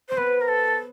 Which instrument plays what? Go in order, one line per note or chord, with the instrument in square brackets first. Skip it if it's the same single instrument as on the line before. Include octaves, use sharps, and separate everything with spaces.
[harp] C4 [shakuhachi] C5
[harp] B3 [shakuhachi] B4
[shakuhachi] A#4
A4